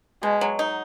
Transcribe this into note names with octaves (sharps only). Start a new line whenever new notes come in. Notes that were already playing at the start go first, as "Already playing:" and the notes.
B2 G#3
F#3
D#4